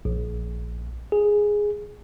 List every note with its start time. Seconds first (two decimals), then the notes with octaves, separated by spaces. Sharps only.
0.05 A#1
1.12 G#4